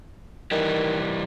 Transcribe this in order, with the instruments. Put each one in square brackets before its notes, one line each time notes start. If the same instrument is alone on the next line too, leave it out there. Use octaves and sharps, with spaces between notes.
[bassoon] D#3 [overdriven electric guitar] E3 G3